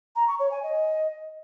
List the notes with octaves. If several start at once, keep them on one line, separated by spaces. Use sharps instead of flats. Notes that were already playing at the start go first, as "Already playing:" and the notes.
A#5
C#6
C#5
G#5
D#5